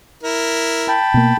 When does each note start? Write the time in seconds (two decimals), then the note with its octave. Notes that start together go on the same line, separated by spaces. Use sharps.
0.23 E4 A#4
0.88 G5 A5 B5
1.14 B2 A#3